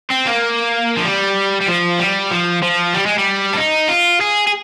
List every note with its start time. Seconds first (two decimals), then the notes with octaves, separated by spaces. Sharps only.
0.10 C4
0.26 A#3
0.97 F3
1.05 G3
1.61 G3
1.68 F3
1.99 G3
2.31 F3
2.63 F3
2.94 G3
3.06 G#3
3.18 G3
3.53 D4
3.57 D#4
3.89 F4
4.21 G#4
4.47 G#4